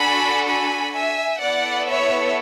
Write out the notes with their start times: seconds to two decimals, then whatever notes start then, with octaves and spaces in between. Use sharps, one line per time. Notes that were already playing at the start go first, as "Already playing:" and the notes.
Already playing: D4 F#4 A4 G#5 B5
0.48 G#5 B5
0.95 E5 G#5
1.41 B3 E4 A4 D5 F#5
1.88 C#5 E5